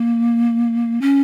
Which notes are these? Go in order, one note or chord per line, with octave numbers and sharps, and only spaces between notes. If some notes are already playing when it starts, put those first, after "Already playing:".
Already playing: A#3
C#4